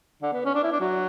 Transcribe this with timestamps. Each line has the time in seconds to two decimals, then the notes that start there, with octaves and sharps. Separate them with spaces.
0.23 D3
0.33 B3
0.45 C#4
0.55 D4
0.64 E4
0.72 D4
0.81 F#3